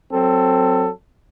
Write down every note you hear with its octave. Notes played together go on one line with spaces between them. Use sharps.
F#3 C4 A4